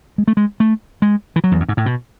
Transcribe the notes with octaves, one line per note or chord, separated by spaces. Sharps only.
G#3
A3
G#3
A3
G#3
E3
F#3
E2
F#2
G#2
A2
B2